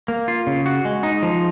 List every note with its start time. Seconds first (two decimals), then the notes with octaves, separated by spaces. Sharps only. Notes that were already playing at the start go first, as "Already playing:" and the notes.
0.08 A#3
0.28 F4
0.47 C#3
0.66 F#4
0.85 G#3
1.03 D#4
1.23 F3